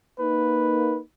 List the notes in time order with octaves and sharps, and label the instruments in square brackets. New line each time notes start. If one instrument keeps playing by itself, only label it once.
[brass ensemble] A#3 D#4 [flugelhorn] B4